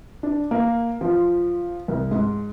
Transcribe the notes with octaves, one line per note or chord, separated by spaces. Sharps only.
D4
A#3
F3
C2
G#2